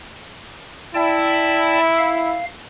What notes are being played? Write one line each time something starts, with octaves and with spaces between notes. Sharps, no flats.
E4 D5 G5 A5
F5